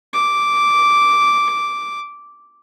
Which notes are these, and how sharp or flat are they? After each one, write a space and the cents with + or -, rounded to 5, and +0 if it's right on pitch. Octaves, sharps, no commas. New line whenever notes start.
D6 -5